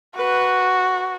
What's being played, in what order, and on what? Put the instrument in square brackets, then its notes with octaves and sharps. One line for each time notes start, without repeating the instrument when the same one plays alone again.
[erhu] F#4 [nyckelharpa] B4